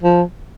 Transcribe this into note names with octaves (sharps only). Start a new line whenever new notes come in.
F3